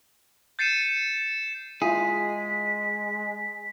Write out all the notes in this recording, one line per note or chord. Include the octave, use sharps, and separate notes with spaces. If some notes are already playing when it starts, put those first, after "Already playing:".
G6 A6 C7 C#7 D#7 E7
G#3 E4 F4 G#4 B6